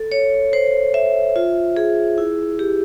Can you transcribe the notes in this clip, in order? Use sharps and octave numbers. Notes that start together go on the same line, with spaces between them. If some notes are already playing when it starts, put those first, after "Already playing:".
Already playing: A4
C#5
C5
E5
F4
G#4
E4
G4